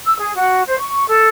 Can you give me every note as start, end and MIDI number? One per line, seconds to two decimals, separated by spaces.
0.05 0.19 88
0.20 0.34 68
0.35 0.63 66
0.67 0.79 72
0.79 1.05 85
1.07 1.28 69